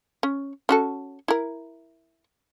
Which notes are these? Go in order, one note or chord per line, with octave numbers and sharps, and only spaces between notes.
C#4
C#4 F#4 A4
E4 A#4